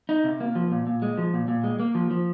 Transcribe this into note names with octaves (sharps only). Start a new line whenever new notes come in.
D#4
C3
A#3
F3
A#2
A#2
G#3
F3
A#2
A#2
G#3
A#3
F3
F3